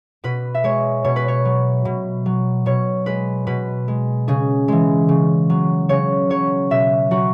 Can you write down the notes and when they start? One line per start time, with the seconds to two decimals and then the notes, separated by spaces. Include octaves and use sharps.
0.24 B2 B4
0.55 E5
0.64 G#3 C#5
1.04 B2 C#5
1.16 B4
1.28 C#5
1.45 F#3
1.85 B2
2.26 F#3
2.66 B2 C#5
3.06 G#3 B4
3.47 B2 B4
3.88 G#3
4.28 C#3 G#4
4.68 E3 G#3
5.09 C#3
5.50 F#3
5.89 C#3 C#5
6.30 F#3 C#5
6.70 B2 E5
7.11 F#3 F#4